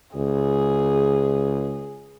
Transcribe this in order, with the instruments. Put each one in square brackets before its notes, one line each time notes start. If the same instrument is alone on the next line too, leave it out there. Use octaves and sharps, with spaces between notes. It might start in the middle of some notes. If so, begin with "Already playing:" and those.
[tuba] C#2 [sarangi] G#4